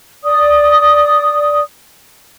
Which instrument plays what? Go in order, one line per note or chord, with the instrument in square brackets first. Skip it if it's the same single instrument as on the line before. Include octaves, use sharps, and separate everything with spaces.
[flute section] D5 D#6